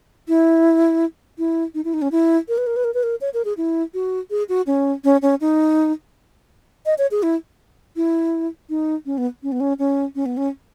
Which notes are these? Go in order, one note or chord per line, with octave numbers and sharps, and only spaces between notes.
E4
E4
D#4
E4
D#4
C#4
E4
A#4
B4
A#4
B4
A#4
B4
A#4
C#5
A#4
G#4
E4
F#4
G#4
F#4
C#4
C#4
C#4
D#4
D#5
C#5
G#4
E4
E4
D#4
C#4
B3
C#4
B3
C#4
C#4
C#4
B3
C#4